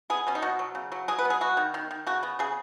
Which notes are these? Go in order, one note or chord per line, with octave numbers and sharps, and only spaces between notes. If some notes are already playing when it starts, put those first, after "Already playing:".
B3 G#4
B2 C#4
D#4
B2 F#4
F#3
C#3
F#3
F#3 G#4
B4
B3
G#4
B3 F#4
D#3
D#3
D#3
C#3 F#4
B3
C#3 G#4